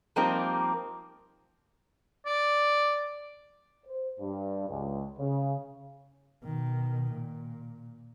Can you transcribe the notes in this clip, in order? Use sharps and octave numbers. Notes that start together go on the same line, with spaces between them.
F3 G3 A#3 C4 D#4 A#4
D5
C5
G2
C#2
C#3
B2 D#3
A#2